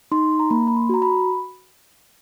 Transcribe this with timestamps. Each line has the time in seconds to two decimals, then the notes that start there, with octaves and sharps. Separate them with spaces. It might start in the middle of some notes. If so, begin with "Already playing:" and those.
0.12 D#4 C6
0.39 A#5
0.50 A#3 B5
0.67 B5
0.76 C6
0.89 F#4 A#5
1.02 B5